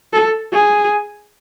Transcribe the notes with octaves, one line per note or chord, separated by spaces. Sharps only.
A4
G#4